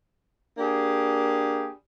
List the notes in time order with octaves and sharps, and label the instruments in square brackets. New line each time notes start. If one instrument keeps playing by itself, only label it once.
[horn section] A#3 D4 G4 G#4